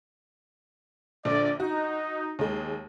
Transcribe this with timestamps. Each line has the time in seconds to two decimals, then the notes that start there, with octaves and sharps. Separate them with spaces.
1.25 A#1 D3 D5
1.60 D#4 F#4
2.39 D#2 G#3 G#4